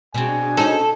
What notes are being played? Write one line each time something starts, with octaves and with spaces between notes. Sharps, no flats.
B2 C4 D4 F#4 G#4 G#5
C#4 D#4 A4 C5